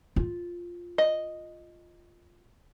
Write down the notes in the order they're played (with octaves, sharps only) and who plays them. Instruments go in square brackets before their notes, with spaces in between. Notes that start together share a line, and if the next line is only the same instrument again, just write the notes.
[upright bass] F4
[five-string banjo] D#5